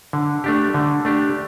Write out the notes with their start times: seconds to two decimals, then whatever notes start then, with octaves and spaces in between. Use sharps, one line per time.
0.13 D3
0.44 A3 D4 G4
0.74 D3
1.05 A3 D4 G4